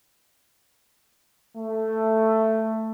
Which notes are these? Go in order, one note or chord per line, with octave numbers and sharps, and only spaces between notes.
A3